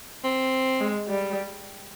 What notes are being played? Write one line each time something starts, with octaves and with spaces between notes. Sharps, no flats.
C4
G#3
G3